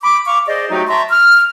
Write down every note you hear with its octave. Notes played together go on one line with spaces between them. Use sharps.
B5 D6
F5 B5 C#6 D6
G#4 C5 D5 D#5
F#3 A3 D#4 F#4 G4
E5 A5 A#5 C6 C#6
F6